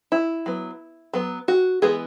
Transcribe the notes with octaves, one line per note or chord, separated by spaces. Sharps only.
E4
F#3 B3
F#3 B3
F#4
E3 G#3 B3 G#4